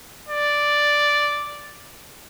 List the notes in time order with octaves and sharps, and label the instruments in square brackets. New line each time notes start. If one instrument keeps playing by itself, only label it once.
[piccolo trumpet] D5